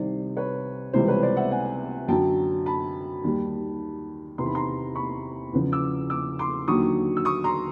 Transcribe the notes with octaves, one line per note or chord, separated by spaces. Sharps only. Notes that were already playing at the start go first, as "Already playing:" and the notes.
Already playing: C2 C3 D#3 C5 D5
B4 C#5
C#2 C3 E3 G3 C5
B4 C#5
C5 D5
E5 F#5
F#5 G#5
F#2 D3 F#3 G5 A5
A5 B5
D#2 D#3 G3
E2 C3 D#3 C6
B5
A#5 C6
B5 C#6
E2 C#3 F3
D6 E6
D6 E6
C6 D6
D#2 D3 F#3 C#6 D#6
E6
C#6 D#6
A#5 C6